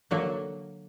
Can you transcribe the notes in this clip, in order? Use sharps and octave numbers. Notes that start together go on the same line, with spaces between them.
D3 F#3 A#3